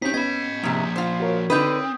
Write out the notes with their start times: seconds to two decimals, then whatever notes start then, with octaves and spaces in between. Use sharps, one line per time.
0.02 C4 C#4 D#4 G4 G6 B6
0.14 B3 C#4 D#5 B5 G#6
0.63 G#2 C3 F3 A#3
0.96 F4 C5
1.20 F#4 A#4 C#5
1.50 D3 C4 D#4 B4 D#6 G6